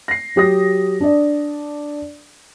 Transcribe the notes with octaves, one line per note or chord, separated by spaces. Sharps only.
A#6 C7
F#3 G4 D#6 A#6
D4 D5